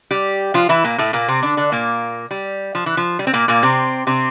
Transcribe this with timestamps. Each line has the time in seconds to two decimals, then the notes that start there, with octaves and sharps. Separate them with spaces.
0.11 G3 G4
0.54 F3 F4
0.69 E3 E4
0.84 A#2 A#3
0.98 A2 A3
1.13 A#2 A#3
1.28 C3 C4
1.43 D3 D4
1.57 D3 D4
1.72 A#2 A#3
2.31 G3
2.75 F3
2.86 E3
2.97 F3
3.19 G3
3.27 C4
3.33 A#2 A#3
3.48 A#2 A#3
3.63 C3 C4
4.07 C3 C4